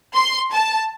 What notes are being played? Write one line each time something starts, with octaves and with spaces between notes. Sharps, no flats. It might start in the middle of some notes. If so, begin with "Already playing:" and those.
C6
A5